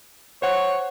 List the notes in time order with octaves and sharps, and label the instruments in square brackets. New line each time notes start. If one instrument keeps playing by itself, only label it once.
[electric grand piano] C5 F#5 F#6 [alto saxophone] C#5